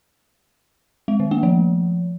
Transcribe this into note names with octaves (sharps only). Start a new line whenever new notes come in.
G#3
D#3
A#3
F3